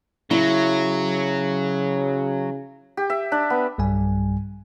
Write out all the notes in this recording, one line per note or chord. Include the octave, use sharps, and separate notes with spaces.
C#3 F#3 E4
G4
E5
D4
B3
B1 G2 G3 G#5